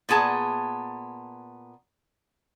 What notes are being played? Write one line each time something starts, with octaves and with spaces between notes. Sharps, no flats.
A#2 B3 G#4 A5